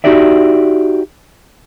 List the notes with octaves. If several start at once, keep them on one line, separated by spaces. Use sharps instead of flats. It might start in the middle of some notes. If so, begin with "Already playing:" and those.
D#4 F#4 G4 D5 E5